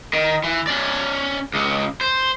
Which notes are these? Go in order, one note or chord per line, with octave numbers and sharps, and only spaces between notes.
D#3
E3
C#4 D5
C#2 C#3
C5